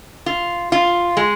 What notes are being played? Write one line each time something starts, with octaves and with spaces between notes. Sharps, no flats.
F4
F4
G#3